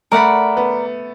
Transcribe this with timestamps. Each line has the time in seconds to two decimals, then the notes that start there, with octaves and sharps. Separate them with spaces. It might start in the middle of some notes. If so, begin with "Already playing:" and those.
0.12 A3 A#4 D5 F#5 B5
0.57 B3